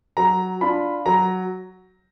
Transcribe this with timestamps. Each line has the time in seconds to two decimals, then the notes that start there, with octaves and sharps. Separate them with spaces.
0.17 F#3 A#5
0.61 D4 F4 B5
1.06 F#3 A#5